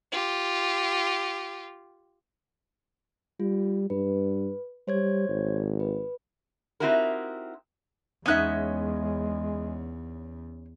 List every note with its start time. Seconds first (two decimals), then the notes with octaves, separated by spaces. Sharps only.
0.12 F4 G4
3.40 G3 F4
3.90 G2 B4
4.88 G3 C5 C#5 G#6
5.29 G#1
5.80 B4
6.80 C4 D#4 E4 F#4 G4 A#4
8.26 E2 G#3 B3 C#4 D#4 E5 F#6